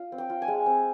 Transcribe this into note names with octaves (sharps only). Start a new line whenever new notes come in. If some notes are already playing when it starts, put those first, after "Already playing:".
Already playing: F4
C4
G5
F4
G#5
G#3
C4